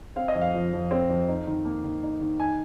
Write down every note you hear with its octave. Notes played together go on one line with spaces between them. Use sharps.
C4 F5
D#5
F2
F5
F3
F2
C4
F2
D#4
D#3
A#3
D#3
D#4
D#3
D#4 G#5